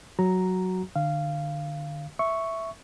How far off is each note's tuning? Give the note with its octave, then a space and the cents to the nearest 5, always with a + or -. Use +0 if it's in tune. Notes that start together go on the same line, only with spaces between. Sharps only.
F#3 +0 F#4 +0 A#5 +0
D3 +35 F5 -15
E5 +0 C#6 +0